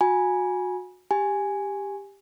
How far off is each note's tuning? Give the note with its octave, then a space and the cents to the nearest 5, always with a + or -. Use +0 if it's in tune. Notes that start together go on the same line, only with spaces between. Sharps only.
F#4 -25 G#5 +0 B5 -35
G4 +10 G#5 +0